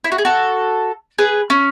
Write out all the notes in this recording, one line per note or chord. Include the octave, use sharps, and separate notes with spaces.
E4
F#4
G#4
F#4 A4
G#4 B4
C#4